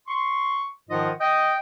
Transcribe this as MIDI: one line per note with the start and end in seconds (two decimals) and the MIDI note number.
0.08 0.68 84
0.08 0.68 85
0.90 1.10 44
0.90 1.10 51
0.90 1.10 53
0.90 1.10 65
0.90 1.10 75
0.90 1.10 78
1.21 1.58 75
1.21 1.58 79